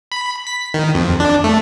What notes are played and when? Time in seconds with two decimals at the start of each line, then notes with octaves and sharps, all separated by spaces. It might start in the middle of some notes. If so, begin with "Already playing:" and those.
0.12 B5
0.47 B6
0.74 D#3
0.95 F2
1.20 D4
1.44 A3